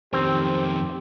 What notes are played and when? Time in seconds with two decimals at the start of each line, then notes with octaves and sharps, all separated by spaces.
0.13 F2 D#3 C4 G4 C5